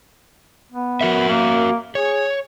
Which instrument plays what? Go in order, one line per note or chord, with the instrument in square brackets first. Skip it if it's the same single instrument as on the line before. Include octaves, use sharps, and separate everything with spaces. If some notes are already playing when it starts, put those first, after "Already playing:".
[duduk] B3
[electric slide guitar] F#4 A#4 E5
[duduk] A#3
[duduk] G#4 [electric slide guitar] C#5